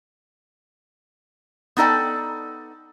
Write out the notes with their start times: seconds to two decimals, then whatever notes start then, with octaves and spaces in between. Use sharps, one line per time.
1.77 B3 D#4 A4 D5 G5